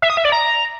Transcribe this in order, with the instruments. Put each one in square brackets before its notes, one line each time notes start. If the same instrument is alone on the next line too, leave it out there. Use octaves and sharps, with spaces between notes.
[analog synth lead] E5
D#6
E5
D5
A#5